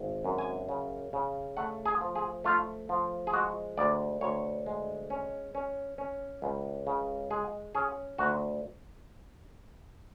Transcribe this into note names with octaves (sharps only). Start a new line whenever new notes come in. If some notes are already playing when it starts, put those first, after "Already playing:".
Already playing: G#1
F#2
G#5
C#3
C#3
A3 F#5
G#4
F3
G#4
A3 F4
F3
G#4
G#3 F#4
D2 D5
D2 C#5
G#3
C#4
C#4
C#4
C#2
C#3
G#3 G#4
C#4 G#4
D2 F#4